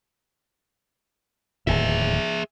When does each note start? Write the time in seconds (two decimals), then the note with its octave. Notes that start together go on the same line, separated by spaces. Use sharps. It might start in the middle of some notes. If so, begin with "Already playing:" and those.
1.67 D1 D#2 A2 G#4 E5